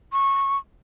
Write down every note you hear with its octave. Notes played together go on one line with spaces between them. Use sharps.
C#6